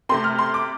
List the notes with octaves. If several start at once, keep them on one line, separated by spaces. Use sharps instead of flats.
C3 A3 C4 C6
F6
C6
D6